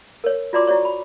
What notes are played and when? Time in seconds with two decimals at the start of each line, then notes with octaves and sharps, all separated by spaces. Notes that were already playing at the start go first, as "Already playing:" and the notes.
0.24 A#4 C#5
0.53 F4 F#4 D5 A#5 C6 D6
0.67 E4 F#4 C#5 D5 C#6
0.85 B5